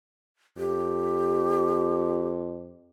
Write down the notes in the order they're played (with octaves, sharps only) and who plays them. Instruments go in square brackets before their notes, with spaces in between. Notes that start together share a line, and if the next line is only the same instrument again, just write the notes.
[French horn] F2 [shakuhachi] G4